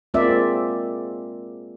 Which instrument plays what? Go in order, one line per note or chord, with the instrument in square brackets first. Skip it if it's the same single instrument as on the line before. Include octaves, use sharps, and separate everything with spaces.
[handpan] G#3 A#3 C4 F4 D5 E5